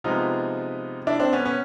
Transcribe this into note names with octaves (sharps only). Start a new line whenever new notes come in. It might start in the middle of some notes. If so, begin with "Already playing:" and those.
C3 F3 G#3 B3 D#4 F4
D4 E4
C4 D4
B3 C#4
B3 C#4